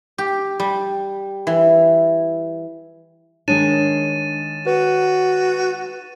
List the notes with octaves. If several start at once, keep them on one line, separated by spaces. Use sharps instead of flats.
G4
G3
E3
D#3 G#3 D4 C#5 A6 D#7 E7
F#4 B4